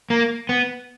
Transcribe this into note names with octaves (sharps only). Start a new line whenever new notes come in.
A#3
B3